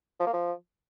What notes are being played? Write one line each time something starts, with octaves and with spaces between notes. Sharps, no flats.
F3
A#3
F3